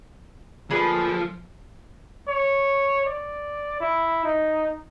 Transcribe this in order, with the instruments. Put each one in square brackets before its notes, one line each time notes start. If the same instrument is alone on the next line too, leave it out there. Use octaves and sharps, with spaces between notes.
[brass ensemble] D2 A#3 A4 [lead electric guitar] F3 [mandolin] G#4 B4 D5
[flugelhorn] C#5
D5
E4
D#4